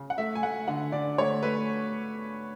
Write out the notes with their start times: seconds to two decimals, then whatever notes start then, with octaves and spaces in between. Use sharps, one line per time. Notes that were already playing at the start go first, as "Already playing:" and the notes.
Already playing: C#3
0.10 F#5
0.18 A3 E5
0.35 G#5
0.43 A3 F#5
0.68 D3 F#5
0.92 D3 D5
1.18 A3 C#5
1.43 A3 B4